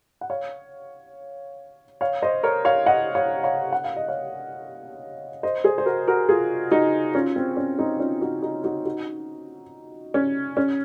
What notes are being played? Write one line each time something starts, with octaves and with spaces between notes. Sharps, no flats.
F#5
C#5 F5
C#5 F5
C5 D#5
A#4 C#5
C#5 F5
D#5 F#5
C#5 F5
C#5 F5
F#5
F5
D#5
C#5 F5
C5 D#5
G#4 C5
C5
F#4 A#4
F#4 A#4
F4 G#4
D#4 F#4
C#4 F4
C4
C#4
C4 D#4
C#4 F4
D#4 F#4
D#4 F#4
D#4 F#4
D#4 F#4
C#4
C#4